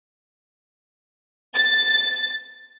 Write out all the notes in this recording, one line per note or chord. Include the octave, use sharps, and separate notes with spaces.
A6